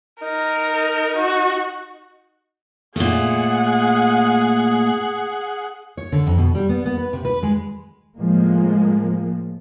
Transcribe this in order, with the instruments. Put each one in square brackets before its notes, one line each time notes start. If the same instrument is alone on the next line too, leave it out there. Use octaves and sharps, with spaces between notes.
[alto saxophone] D#4 [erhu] A#4
[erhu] F#4
[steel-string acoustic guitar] A#2 A3 [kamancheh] G#4 F#5
[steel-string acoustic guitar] C#5
D3
F2
B2
G3
B3
B3
B4
C3
B4
G#3
[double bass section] A2 F3 G#3 A#3